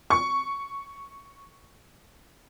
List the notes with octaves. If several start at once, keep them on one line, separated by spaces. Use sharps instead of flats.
C#6 C#7